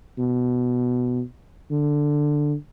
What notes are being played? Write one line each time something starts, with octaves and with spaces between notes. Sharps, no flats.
B2
D3